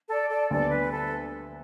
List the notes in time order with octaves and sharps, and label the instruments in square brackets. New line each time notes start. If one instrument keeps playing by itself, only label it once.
[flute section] A4 D5
A4 D5
[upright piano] D2 D3 G3 B3 [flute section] A4 D5
[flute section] B4
A4